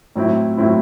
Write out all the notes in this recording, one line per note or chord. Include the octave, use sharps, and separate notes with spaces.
A2 F#3 C4 E4
A2 F#3 C4 E4